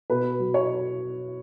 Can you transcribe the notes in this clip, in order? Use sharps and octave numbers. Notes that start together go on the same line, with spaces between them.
B2 B4
F#3
C#5